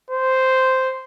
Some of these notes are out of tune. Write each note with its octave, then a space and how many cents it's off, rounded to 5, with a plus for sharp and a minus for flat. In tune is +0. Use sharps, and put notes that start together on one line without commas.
C5 -5